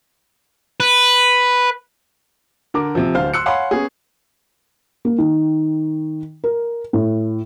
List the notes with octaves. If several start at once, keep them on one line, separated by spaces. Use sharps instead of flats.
B4
D3 A#4 D6
C3 F3
D1 D3 C5 F5 F6
C6 E6 F#6 C#7
C#5 F5 F#5 G#5 B5 C6
B3 C#4 G#4
A#3
D#3
A#4
A2